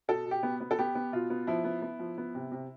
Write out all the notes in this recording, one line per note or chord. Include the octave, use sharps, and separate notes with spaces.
B2 A4
B2
G4
B3
B3
A4
B3 G4
B3
B2 F4
B3
F3 E4
B3
B3
F3
B3
C3
C3